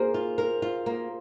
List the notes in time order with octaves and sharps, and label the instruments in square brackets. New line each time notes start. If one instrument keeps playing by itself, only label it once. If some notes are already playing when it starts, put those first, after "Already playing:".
Already playing: [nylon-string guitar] A#3 [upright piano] G#4 C5
[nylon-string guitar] F4
A#4
F4
A#3